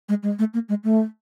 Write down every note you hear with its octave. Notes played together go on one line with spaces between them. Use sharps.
G#3
G#3
A3
A#3
G#3
A3